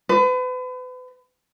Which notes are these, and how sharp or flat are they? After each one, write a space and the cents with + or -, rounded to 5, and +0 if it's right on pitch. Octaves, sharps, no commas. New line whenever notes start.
B4 +35